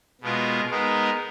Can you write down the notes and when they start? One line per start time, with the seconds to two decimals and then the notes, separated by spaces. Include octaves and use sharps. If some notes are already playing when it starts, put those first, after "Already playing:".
0.21 B2 G#3 B3 F4 A#4
0.70 G#3 B3 D#4 A#4